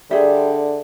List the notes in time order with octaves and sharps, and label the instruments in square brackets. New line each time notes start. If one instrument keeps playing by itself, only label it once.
[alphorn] D3 [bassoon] G3 [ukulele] G#4 E5